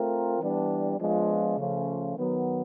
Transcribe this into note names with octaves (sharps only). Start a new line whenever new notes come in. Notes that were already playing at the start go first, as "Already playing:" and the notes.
Already playing: A3 C4 F4 A#4
E3 G3 B3 D4
F3 G#3 B3 D4 F4
C#3 F3 A3 C#4 F4
D#3 F#3 B3